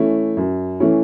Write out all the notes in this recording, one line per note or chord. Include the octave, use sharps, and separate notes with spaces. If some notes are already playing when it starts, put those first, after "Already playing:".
Already playing: E3 A3 C#4 E4
F#2
E3 A3 C#4 E4